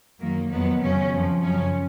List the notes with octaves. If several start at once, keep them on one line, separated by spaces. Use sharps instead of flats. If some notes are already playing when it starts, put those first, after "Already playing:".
F#2 D#3 F#3 A#3
F2 D#3 F#3 B3
F2 C#3 F#3 C#4
F2 F3
F#2 C#3 F3 C#4